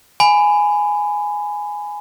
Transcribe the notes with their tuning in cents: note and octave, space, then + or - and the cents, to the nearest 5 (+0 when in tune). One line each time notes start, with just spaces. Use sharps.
G#5 +0 B5 +20